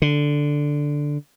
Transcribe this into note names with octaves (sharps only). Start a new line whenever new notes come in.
D3